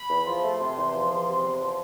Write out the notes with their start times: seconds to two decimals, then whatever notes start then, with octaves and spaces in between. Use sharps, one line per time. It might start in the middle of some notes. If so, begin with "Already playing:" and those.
Already playing: B5
0.09 E2
0.26 F3 C6
0.43 A3
0.60 C3
0.75 E2
0.92 F3
1.09 E2
1.26 C3
1.43 E2
1.59 F3